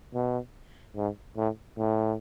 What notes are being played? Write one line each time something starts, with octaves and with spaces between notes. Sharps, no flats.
B2
G#2
A2
A2